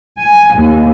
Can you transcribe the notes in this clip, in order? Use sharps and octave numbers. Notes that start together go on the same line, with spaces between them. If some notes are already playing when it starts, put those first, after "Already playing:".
G#5
D#2